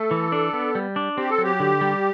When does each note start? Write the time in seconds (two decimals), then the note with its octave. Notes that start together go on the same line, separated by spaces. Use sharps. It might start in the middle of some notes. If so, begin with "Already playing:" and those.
Already playing: A3 A4
0.11 E3
0.32 D4
0.53 B3
0.75 G3
0.96 D4
1.17 C4 G4
1.30 A4
1.38 F#3 G4
1.60 D3
1.81 G3